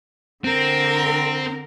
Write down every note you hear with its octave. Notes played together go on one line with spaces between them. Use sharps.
D3 C4 A#4